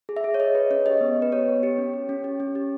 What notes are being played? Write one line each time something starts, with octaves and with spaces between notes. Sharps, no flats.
G#4
E5
G#4
C#5
G#4 D#5
G#4 B4
C#4 C#5
G4 D#5
B3
B3
B4
G4 C#5
B3
G4
C#4
G4
C#4
G4
C#4
G4